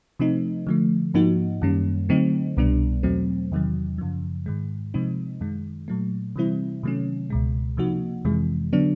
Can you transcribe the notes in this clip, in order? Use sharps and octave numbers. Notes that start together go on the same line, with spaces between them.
C3 F3 A3 C4 D#4
D3 F3 A3
G#2 F3 A#3 D#4 F#4
F#2 D#3 G3 A#3 C#4
D3 F#3 A3 C4 D#4
C2 B2 G3 B3 D4
E2 B2 F#3 A3 C4
E2 C3 D#3 F#3
F#2 C#3 F3
G#2 D#3 G#3
C3 F3 G#3 C4 D#4
F#2 D#3 G#3
A#2 F#3 A3
C3 E3 G3 C4 E4
C3 D#3 F#3 A3 C#4
C#2 B2 G#3
C3 F3 A#3 D#4 F#4
F2 C3 E3 G#3
D3 F#3 B3 D4